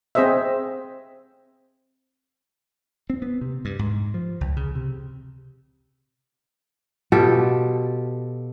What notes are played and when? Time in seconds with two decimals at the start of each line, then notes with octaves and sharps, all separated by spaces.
0.15 C4 G#4 C5 D#5 E5
3.10 C4
3.22 B3
3.41 C3
3.65 G2
3.79 G#2
4.14 F3
4.41 C#2
4.57 C#3
4.75 C3
7.12 B2 F4 G4 A4